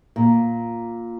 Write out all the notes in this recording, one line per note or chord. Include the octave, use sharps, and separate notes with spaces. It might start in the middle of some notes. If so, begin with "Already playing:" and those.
A#2